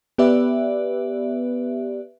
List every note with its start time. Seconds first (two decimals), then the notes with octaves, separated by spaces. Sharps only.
0.18 B3 G4 B4 D5 E5